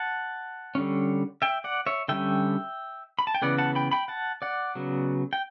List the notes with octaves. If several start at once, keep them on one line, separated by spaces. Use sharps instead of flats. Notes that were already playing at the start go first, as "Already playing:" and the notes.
Already playing: F#5 A5
D3 G3 C#4
E5 G5
D5 F#5
C#5 E5
D3 G3 C#4 E5 G5
B5
A5
G5
C#3 E3 B3 D5 F#5
F#5 A5
G5 B5
G5 B5
F#5 A5
D5 F#5
C#3 F#3 B3
G5